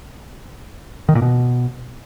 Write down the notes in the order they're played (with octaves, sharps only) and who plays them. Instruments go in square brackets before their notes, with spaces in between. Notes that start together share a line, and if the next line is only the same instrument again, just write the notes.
[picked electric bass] D#3
A#2
B2